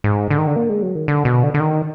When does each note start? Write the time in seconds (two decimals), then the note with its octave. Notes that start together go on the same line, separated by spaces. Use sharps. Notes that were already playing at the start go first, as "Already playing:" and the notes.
0.04 G#2
0.30 D3
0.38 D#3
0.47 D3
0.56 A#3
0.69 G#3
0.82 F#3
0.95 D#3
1.08 D3
1.25 B2
1.43 D3
1.54 D3
1.60 D#3